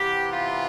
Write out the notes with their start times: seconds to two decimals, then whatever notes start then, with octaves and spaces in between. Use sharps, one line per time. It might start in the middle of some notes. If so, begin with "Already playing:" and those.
Already playing: C3 E3 B3 G4
0.30 F4